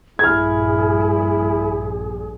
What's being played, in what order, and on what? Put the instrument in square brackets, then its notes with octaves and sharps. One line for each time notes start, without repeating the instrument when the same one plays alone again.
[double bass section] A#1 G2 A#2 [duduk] E4 [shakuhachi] G#4 [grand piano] F6 G#6